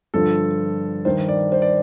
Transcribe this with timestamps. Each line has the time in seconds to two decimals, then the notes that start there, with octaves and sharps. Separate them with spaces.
0.14 G2 D3 F3 A4
1.05 G2 D#3 C5
1.29 D5
1.52 C5
1.62 D5